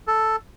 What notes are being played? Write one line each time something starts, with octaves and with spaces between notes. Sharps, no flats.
A4